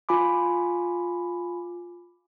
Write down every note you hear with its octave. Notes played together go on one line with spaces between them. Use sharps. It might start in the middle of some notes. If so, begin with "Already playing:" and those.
F4 G#5 B5 D6